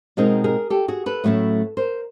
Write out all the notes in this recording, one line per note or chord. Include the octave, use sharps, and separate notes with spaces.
B2 G#3 C4 D#4 G#4 A#4
G#4 A#4
G4 A4
F#4 G#4
A4 B4
A2 F#3 A3 C#4 E4
A#4 C5